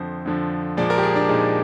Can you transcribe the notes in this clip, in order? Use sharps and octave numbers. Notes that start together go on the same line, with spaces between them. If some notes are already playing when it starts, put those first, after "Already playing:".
Already playing: F2 D3 F3 C5
F2 D3 F3
A#2 F3 G#3 D5
A#4
G4
G#4
D4
A#2 F3 G#3 D#4